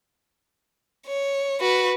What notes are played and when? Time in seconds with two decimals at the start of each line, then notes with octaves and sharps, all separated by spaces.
1.07 C#5
1.60 F#4 B4